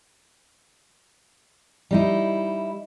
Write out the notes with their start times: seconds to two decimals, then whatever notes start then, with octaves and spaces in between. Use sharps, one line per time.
1.91 G3 D#4 E4